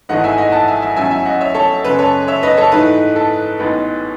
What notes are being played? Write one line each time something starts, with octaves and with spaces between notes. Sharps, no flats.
G#1 G#2 E3 A3 D#5 F#5
E5 G#5
D#5 F#5
F#5 A5
E5 G#5
E5 G#5
A1 A2 F#3 C#4 E5 G#5
E5 G#5
D#5 F#5
C#5 E5
A4 C#5
F#2 C#3 G#3 B4
A4 C#5
C#5 E5
B4 D#5
A4 C#5
G#2 E3 A3 D#4 B4
A4
A1 A2 G#3 B3 D#4 B4